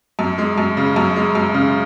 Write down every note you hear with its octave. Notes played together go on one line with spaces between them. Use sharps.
F#2
G#3
F#2
C#3
F#2
G#3
F#2
C#3